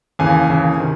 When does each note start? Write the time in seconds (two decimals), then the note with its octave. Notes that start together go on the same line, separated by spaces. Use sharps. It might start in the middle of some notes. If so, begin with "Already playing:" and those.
0.19 D#2 C#3 E3 G#5
0.48 D#2 C#3 E3
0.78 C3 D#3